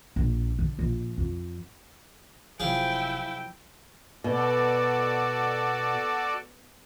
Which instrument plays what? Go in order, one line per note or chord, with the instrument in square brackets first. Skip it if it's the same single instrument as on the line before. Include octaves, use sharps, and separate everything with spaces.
[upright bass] A#1
D3
A#1
F2
[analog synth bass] F1 [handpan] C3 F3 F#3 [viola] E4 G5 [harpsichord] G#4 F5
[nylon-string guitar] B2 [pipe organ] F#4 A4 D5